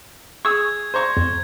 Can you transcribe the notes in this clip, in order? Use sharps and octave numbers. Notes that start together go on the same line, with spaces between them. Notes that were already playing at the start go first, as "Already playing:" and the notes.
G#4 C#6 D#6 E6 G#6
C5 A#5 C#6
F2